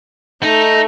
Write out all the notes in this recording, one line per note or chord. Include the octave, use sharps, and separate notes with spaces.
A3 D#4